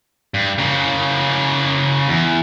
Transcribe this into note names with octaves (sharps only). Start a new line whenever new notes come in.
G2
C#3 A#3
E2